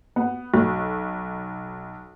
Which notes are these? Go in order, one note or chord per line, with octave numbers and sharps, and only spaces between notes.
B3
B1